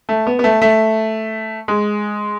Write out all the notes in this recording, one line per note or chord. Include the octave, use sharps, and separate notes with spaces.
A3
B3
B3
A3
A3
G#3